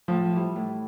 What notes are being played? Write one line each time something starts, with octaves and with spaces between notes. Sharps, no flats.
A2 F3
E3 G3
A2